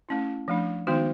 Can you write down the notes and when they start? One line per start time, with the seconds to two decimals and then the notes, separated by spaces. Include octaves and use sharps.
0.09 A3 C#4 E4
0.48 F3 A3 D4
0.87 D#3 G#3 B3 D#4 F#4